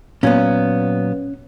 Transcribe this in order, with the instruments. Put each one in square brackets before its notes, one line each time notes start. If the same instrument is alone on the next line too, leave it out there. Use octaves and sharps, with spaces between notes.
[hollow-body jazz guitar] A#2 F#3 B3 C#4